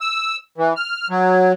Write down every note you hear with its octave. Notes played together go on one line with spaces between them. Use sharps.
E6
E3
F6
F#3